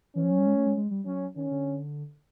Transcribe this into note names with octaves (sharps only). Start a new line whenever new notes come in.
E3 C#4
F3
F#3
G3
G#3
A3
G#3
G#3
G3
F#3 C#4
D#3 C#4
D3